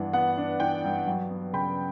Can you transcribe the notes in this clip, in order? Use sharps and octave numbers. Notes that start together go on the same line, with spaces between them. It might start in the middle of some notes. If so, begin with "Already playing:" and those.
Already playing: G2 E3 B3 D4 F#5
B3 F#5
D4
E3 G5
G2
F#3
B3
C#3 G5 B5